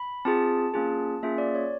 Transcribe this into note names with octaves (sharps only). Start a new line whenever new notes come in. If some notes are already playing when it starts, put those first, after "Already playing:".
Already playing: B5
C4 F4 G#4 A5
A#3 C#4 F4 G#4
A#3 C#4 F4 G#4 E5
D5
C#5